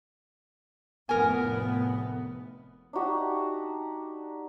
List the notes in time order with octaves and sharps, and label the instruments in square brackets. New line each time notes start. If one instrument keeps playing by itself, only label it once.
[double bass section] F1 A2 B3 [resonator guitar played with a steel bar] A#4 G#5
[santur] D4 D#4 F#4 G4